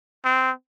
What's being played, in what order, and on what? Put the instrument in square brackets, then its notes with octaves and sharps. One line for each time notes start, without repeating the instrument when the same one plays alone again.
[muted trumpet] C4